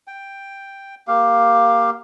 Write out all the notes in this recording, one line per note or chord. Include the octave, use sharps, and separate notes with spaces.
G5
A#3 G4 F5